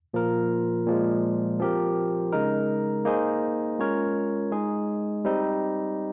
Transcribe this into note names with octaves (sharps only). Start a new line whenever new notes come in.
A#2 F3 A#3 F4 A#4
A#2 F3 G#3
F3 C4 G4 A#4
C#3 G#3 D#4 A#4
A#3 D#4 G#4 C5
G#3 C#4 F4 A#4 C#5
G#3 D#4 G#4
G3 C4 D#4